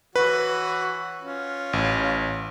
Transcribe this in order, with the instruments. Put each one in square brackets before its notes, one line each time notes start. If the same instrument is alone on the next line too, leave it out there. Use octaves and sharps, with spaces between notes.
[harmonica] E3 F#4 C#5 [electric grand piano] B4
[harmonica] C#4 F4
[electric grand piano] A1